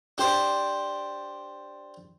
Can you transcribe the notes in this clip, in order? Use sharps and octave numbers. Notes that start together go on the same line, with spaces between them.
D4 G4 C5 D5